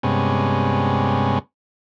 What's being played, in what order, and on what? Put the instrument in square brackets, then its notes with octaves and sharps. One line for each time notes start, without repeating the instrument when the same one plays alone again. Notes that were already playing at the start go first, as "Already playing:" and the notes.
[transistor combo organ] G2 C3 G#3 B3 C#4